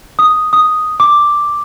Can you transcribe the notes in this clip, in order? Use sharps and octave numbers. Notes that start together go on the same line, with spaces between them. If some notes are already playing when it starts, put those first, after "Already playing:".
D#6
D#6
D6